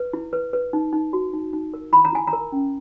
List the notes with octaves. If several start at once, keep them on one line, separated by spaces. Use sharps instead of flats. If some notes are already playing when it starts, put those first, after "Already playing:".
Already playing: B4
E4
B4
B4
D#4
D#4
F#4
D#4
D#4
A#4
E4 B5
A#5
E4 G#5
A#5
A#4
C#4